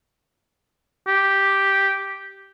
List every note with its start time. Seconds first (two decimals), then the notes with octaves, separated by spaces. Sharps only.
1.07 G4